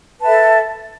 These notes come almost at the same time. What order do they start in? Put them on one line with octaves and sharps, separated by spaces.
B4 A5 E5 A4